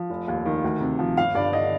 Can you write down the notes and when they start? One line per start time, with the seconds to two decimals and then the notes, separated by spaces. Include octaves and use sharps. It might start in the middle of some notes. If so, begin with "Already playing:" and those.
Already playing: F3
0.10 F1
0.28 D#2
0.45 D#3
0.64 D2
0.81 C3
0.99 F3
1.17 G1 F5
1.35 G2 D5
1.53 D3 D#5